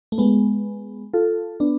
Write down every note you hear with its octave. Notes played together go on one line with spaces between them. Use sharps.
A3
G#3 B3
F4 A4
B3 D4